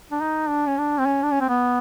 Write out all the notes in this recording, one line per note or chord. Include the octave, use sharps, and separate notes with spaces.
D4
D#4
D4
C#4
D4
C4
C#4
D4
C#4
C4
B3